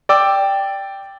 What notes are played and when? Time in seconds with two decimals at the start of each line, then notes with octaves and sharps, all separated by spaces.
0.09 D5 G5 D6 E6